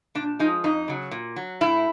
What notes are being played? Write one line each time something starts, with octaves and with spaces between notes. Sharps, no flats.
A#2 D4
F3 G#3 D#4
F2 D#4
C#3 F#3
A#2
F#3
A2 E4